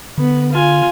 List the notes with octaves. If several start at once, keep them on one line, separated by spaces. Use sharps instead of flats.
D3 B3
F4 G#5